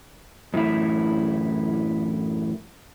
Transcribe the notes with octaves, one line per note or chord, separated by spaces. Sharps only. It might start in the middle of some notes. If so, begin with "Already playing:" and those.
F#2 A2 E3 E4